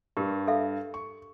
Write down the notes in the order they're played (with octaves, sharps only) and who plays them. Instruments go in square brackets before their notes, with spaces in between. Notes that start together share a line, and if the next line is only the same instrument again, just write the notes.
[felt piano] G2 [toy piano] G4 A#4
[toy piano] A4 E5 F5
[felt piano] C#6